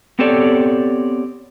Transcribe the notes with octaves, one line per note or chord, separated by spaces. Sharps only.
B3 C4 G4 A4 C#5 D5